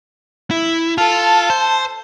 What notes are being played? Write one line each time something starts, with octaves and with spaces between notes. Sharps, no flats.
E4
F4 A4 A5
C5